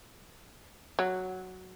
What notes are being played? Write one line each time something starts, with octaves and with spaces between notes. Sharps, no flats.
F#3